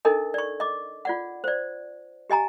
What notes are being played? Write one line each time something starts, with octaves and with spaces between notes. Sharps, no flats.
D4 D#4 A4 A#4 D#5
D5 C#6
D#5 D6
F4 D5 F#5
C5 D5
G4 D#5 G#5 A#5